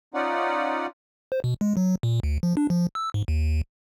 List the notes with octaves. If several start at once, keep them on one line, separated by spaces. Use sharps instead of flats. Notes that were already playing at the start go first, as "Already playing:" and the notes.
C#4 D#4 F4 D5 F#5
C5
B2
G#3
F#3
A#2
D2
F3
D4
F3
E6
G#2
D#2